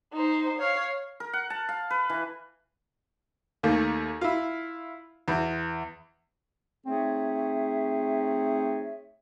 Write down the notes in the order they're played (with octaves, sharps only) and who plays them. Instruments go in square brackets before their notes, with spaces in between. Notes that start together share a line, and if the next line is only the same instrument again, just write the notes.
[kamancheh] D#4 C5
C#5 F5
[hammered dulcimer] A#4
F#5
A5
F5
B4
E3
[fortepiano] D#2 A3 A#3
E4 F4
E2
[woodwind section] A3 C4 D#4 G#4 C#5 E5